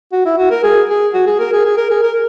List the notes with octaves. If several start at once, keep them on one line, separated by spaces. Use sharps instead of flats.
F#4
E4
F#4
A#4
G#4
G#4
F#4
G#4
A#4
G#4
G#4
A#4
G#4
A#4